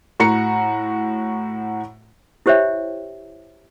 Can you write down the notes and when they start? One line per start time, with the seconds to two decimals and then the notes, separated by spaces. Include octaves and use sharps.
0.20 A2 F#4 F#5 A#5 C#7
2.46 E4 G4 C5 C#5 E5 G5